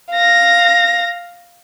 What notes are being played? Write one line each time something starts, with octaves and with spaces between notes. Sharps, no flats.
F5 A#6